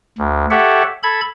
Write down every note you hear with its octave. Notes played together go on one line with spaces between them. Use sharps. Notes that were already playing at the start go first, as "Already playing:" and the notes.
D2
G4 A4 C#5 E5 F#5
A4 B5 G#6